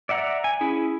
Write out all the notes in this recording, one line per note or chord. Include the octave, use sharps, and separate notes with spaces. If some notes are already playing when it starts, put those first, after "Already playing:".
D5 E5 F#5 A#5
G#5
C#4 E4 G#4